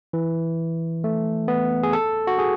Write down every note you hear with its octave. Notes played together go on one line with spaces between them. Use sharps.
E3
A3
B3
G#4
A4
F#4
G#4